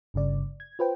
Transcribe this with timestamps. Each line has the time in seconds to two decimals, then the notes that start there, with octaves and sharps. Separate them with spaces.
0.14 G1 G2 C#3 D5
0.60 G#6
0.79 F4 B4 C5 G5